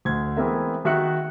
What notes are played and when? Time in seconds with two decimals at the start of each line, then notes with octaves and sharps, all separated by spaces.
0.05 D2 G#6
0.37 E3 G#3 B3 C4 A#4 E5
0.85 D#3 F#4 E5 F#5 F#6 C#7